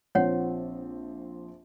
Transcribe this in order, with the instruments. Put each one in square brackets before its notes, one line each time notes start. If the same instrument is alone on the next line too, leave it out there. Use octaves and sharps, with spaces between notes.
[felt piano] A#1 F3 C4 [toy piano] C#5 F#5